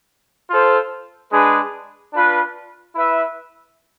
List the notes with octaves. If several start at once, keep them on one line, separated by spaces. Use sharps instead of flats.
F4 A4 C5
G#3 D4 G#4 B4
D4 F4 B4
E4 B4 E5